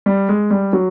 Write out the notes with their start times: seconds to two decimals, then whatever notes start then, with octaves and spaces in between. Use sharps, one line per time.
0.06 G3
0.29 G#3
0.51 G3
0.73 F#3